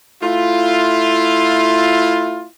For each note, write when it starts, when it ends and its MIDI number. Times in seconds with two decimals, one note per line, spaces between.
0.23 2.46 57
0.23 2.46 64
0.23 2.46 65